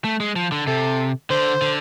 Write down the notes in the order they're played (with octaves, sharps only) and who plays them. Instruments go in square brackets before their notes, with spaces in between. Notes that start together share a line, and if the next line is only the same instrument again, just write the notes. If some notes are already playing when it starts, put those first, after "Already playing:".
[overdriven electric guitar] A3
G#3
F3
D3
[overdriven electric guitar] C3 [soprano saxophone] A4
[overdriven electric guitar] D3 [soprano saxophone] C5
[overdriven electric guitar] D3